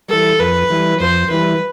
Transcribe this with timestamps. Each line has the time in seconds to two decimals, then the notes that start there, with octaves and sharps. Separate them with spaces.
0.09 E3 G3 A4
0.40 F2 B4
0.70 E3 G3
1.00 F2 C5
1.30 E3 G3 B4